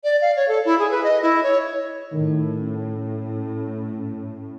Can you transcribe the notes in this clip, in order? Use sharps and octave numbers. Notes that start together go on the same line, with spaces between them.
D5
F5
C#5
A4
E4
G#4
B4
D#5
E4
C#5
A2 D#3
C#4